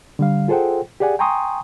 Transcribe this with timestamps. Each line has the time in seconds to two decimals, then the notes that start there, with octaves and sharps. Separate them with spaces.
0.19 D3 G3 F5
0.48 F4 G#4 A4 C5 F#5 G5
1.00 G4 G#4 D5 F#5 G#5
1.19 G5 G#5 A#5 C6 C#6 D#6